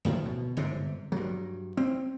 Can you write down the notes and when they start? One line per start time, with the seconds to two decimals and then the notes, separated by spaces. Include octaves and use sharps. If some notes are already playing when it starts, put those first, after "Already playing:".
0.05 D2 A2 D#3 F3
0.25 B2
0.57 G1 G#2 C3
1.12 G2 F#3
1.77 C4